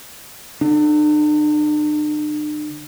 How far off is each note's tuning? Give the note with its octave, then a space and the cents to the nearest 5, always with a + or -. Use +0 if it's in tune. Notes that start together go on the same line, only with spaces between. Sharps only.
D3 +0 D4 +45